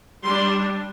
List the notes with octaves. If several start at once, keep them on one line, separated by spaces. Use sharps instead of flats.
G3 D4 C6